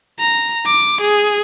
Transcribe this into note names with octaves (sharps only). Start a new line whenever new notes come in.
A#5
D6
G#4